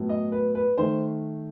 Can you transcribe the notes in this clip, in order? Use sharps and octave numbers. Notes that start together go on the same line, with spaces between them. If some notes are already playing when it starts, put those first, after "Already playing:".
Already playing: A2 F#3 B3
D#5
B4
B4
D#3 A3 C5